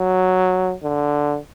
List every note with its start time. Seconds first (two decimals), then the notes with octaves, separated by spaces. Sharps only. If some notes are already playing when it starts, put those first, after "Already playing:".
Already playing: F#3
0.83 D3